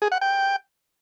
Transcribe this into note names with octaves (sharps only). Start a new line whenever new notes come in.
G#4
F#5
G5